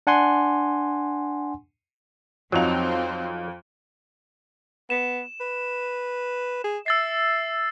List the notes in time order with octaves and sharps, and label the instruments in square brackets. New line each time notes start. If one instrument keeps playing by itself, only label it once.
[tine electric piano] D4 F#5 G#5 C6
[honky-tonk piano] F2 F4 F7 [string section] F3 C4 [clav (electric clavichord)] F#3 D#4
[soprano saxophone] B3 [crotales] E7
[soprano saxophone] B4
G#4
[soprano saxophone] E5 [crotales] E6 A6 C7